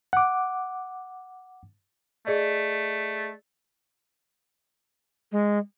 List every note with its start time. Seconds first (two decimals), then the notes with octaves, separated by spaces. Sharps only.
0.13 F#5 D6
2.27 A3 G#4 D5 D#5
5.32 G#3